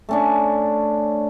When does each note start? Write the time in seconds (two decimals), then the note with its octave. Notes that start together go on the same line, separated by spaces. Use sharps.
0.09 A3 C#4 D4